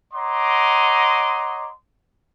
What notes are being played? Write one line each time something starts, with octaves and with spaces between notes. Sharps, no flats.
C#5 D#5 F#5 A#5 C6 D6